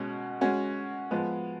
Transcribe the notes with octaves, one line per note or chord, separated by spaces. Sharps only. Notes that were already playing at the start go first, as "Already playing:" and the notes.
Already playing: B2 G#3 C#4 F#4
G#3 C#4 F#4
F3 G#3 B3